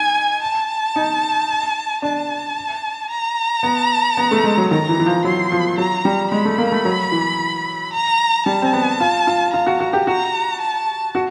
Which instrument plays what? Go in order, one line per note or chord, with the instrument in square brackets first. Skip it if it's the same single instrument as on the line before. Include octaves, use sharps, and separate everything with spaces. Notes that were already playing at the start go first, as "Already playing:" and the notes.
Already playing: [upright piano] D#4 [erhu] G#5
[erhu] A5
[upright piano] D#4
[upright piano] D4 [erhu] A5
[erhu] A#5
[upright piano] B3
B3
A3
G#3
F#3
[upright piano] D#3 [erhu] A#5
[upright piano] E3
E3
F3
[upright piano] F#3 [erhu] C6
[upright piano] F3
[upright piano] F#3 [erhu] A#5
[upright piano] G3
[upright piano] G#3 [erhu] B5
[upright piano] A3
A#3
A3
F#3
E3
[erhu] A#5
[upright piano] G3 [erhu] A5
[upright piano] C4
B3
F4
F4
[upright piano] F4 [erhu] A#5
[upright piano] F#4
F#4
G4
[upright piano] F#4 [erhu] A#5
[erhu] A5
[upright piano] F#4